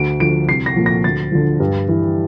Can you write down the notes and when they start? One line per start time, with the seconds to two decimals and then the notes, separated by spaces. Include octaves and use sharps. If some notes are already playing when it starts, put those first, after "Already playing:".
Already playing: D2 D7
0.20 D3 F3 D7
0.48 C2 C7
0.66 A#6
0.76 A#2 F3
0.86 A#6
1.04 D2 A6
1.32 D3 F3
1.60 G2
1.88 E3